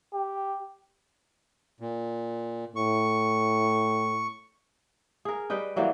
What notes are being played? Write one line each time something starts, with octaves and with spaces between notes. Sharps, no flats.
G4
A#2
A2 C#6
G#4 A#4
G3 B4 D#5 G5
E3 F#3 G3 A#3